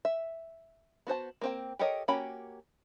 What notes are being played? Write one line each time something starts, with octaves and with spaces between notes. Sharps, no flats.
E5
B3 F#4 C5 A5
A#3 C4 G5
G4 A4 A#4 C#5 D#5
A#3 C#4 F#4 G4 B5